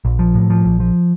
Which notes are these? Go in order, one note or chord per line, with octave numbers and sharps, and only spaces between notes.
A#1
F3
A2
F3
A#1
F3